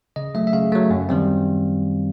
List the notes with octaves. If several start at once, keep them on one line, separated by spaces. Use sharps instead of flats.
C#3 D#5
F#3 A3 E5
E5
C#3 F5
F#3 A3
F#2
D#3 G3 C4